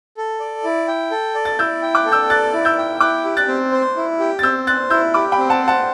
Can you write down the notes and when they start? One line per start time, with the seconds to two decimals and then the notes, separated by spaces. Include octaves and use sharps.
0.17 A4
0.40 D5
0.64 E4
0.88 G5
1.11 A4
1.35 D5
1.45 A6
1.59 E4 E6 G6
1.82 G5
1.95 D6 F#6
2.06 A4
2.12 E6 G6
2.30 D5 F#6 A6
2.53 E4
2.65 E6 G6
2.78 G5
3.01 E4 D6 F#6
3.24 G4
3.37 F#6 A6
3.48 C4
3.72 C5
3.96 E4
4.19 G4
4.39 A6
4.43 C4 E6 G6
4.67 C5 F#6 A6
4.90 E4 E6 G6
5.14 G4 B5 D6
5.32 G5 B5
5.38 C4
5.49 F#5 A5
5.62 C5
5.68 F#5 A5